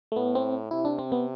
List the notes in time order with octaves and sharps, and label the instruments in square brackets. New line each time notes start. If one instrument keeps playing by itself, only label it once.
[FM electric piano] A3
[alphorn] A2 [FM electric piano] B3
[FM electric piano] C4
[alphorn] C3 [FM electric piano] E4
[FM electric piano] D4
C4
B3